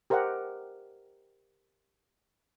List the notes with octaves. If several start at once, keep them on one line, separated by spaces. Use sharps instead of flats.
G4 A#4 C5 D#5 F#5